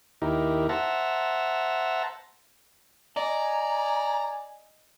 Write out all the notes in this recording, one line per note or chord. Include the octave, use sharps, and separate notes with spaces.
D#2 D#4 E4 G4 A#4
C5 E5 F#5 A5 A#5
D5 D#5 G#5 A#5